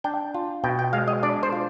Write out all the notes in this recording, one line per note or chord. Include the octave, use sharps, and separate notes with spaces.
D4 G5
F4
B2 G5
G5
G#3 F5
D#5
D4 D5
C5
F4